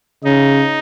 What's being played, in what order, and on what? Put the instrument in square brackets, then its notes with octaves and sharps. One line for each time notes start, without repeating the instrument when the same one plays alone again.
[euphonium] C#3 [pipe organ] D#4